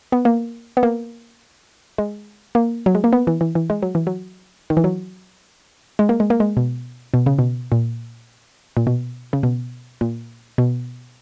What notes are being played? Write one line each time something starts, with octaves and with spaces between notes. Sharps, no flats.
B3
A#3
B3
A#3
G#3
A#3
F#3
G#3
A#3
B3
E3
E3
E3
G#3
F#3
E3
F#3
D#3
E3
F#3
G#3
A#3
G#3
A#3
G#3
B2
B2
C#3
B2
A#2
A#2
B2
C#3
B2
A#2
B2